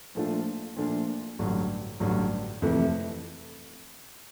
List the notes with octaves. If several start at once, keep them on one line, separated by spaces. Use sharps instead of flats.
A#2 F3 A3 D4 F4
A#2 F3 A3 D4 F4
A1 G2 D3 F#3
A1 G2 D3 F#3
F2 C3 E3 A3